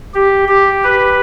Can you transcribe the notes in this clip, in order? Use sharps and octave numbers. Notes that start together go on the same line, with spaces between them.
G4
G4
B4